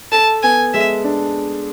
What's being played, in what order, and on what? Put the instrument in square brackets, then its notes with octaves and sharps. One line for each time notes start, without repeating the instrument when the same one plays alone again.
[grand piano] A4 [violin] A5
[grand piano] B3 [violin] G#5
[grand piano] G#3 [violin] E5
[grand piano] D4